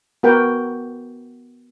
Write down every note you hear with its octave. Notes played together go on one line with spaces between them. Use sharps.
B3 F#4 A#4 B4 G5